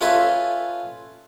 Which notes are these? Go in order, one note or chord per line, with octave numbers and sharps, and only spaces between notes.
C#4 F4 A4 B4 E5 G#5